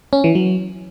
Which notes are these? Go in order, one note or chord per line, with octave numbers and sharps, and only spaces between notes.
C#4
E3
F#3